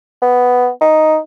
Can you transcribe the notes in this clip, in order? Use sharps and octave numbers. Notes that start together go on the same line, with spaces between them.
B3
D#4